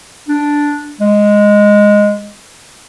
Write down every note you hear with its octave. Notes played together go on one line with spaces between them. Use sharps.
D4
G#3